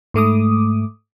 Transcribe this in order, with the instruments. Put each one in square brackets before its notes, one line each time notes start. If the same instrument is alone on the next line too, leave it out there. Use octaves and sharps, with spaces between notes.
[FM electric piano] G#2 A3 D6 D#6